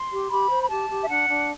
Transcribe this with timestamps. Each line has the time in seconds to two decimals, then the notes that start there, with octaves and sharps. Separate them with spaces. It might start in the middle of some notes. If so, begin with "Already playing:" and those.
Already playing: C6
0.11 G4
0.30 G4 B5
0.50 C5
0.64 B5
0.69 G4 A5
0.89 G4
1.04 E5
1.09 D4 F#5
1.28 D4